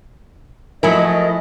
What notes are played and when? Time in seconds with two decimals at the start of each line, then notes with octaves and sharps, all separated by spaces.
0.83 F3 F#3 A3 E4 A#4 D#5 G#5